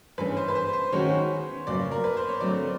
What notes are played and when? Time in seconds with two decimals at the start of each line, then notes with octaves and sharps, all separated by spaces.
0.18 G2 E3 G#3 C#4 B4
0.37 C5
0.48 B4
0.55 C5
0.73 C5
0.92 D#3 G#3 C#4 F#4 C#5
1.67 F2 C#3 F#3 A#3 D5
1.91 A#4
2.04 B4
2.17 C5
2.29 C#5
2.40 D3 F#3 A3 C4 D5